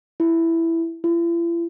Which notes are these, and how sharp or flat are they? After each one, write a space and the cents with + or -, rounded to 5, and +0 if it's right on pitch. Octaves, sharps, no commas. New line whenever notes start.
E4 +5
E4 +45